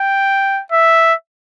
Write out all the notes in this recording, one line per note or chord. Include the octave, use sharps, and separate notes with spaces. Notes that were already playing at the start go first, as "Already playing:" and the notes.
Already playing: G5
E5